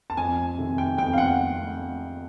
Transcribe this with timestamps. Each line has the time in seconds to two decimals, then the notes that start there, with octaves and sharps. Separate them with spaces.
0.10 A5
0.17 F2 G#5
0.58 C3 D#3
0.78 G5
0.98 F2 G5
1.13 F5
1.18 F#5